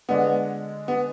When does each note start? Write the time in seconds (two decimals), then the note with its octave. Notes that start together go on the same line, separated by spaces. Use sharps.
0.09 D3 G#3 B3 D4
0.88 B3